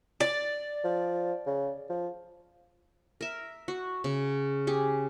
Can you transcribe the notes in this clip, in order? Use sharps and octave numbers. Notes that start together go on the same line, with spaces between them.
D5
F3
C#3
F3
A#4 E5
F#4
C#3
G4 G#4